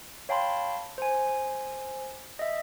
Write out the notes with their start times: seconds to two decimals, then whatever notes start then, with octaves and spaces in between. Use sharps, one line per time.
0.29 C#5 F5 G5 A5 B5 C6
0.98 C5 G#5
2.39 D#5 E5